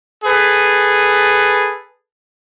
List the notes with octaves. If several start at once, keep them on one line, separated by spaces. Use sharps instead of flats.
G#4 A4 B4